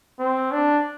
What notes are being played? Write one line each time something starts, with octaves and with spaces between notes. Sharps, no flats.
C4
D4